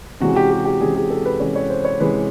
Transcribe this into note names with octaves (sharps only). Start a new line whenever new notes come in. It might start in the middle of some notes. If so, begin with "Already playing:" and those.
C3 E3 G#3 C#4 F#4
G4
G4
G4
C3 E3 G#3 C#4 G#4
G#4
A4
B4
C3 E3 G#3 C#4 C#5
C#5
C5
C#5
C3 E3 G#3 C#4 B4